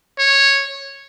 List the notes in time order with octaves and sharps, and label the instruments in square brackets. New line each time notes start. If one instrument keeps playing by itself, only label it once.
[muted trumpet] C#5